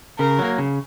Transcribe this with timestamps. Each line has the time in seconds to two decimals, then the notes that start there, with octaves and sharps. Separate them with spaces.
0.19 C#3 A#4
0.39 F#3 A#3
0.58 C#3